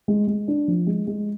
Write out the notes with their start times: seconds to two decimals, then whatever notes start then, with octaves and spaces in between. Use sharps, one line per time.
0.08 G#3
0.27 G#3
0.48 D4
0.68 F3
0.87 G#3
1.07 G#3